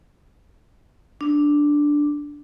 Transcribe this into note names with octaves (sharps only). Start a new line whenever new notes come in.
D4